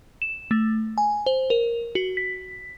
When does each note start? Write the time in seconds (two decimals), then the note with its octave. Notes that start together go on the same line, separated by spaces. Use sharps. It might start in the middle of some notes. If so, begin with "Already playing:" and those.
0.22 E7
0.51 A3
0.98 G#5
1.26 C5
1.50 A#4
1.95 F#4
2.17 B6